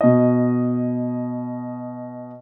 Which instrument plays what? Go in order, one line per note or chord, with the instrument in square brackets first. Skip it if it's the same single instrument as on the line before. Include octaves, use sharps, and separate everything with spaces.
[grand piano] B2 D#5